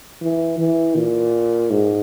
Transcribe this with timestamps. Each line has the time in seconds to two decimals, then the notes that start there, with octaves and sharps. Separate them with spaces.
0.21 E3
0.58 E3
0.96 A#2
1.71 G#2